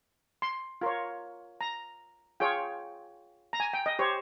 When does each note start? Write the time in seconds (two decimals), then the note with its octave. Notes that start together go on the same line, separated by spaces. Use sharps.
0.42 C6
0.81 F4 A#4 C#5
1.61 A#5
2.40 F4 G#4 C#5 G5
3.53 A#5
3.60 G#5
3.73 G5
3.86 D#5
3.99 G4 C5 C#5